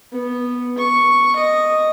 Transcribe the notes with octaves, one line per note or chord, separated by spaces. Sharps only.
B3
C#6
D#5